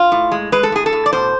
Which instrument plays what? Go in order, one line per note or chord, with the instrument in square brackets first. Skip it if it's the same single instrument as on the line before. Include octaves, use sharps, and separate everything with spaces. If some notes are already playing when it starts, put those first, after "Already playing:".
Already playing: [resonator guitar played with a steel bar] F4
A2
G#3
G#3 B4
A4
A2 G#4
A4
A2
D5
B2 C5